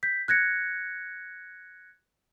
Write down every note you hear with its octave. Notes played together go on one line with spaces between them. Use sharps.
G6 B6
F#6 G#6 A#6 C#7